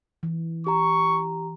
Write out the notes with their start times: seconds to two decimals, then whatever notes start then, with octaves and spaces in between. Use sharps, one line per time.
0.23 E3
0.67 G4 A#5 C#6